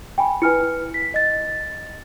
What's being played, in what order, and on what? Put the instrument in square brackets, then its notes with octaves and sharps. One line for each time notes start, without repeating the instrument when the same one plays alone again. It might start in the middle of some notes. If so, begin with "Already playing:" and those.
[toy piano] G5 G#5 B5
[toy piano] E4 G#5 [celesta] B4 F6 C#7
[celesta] B6
D#5 A6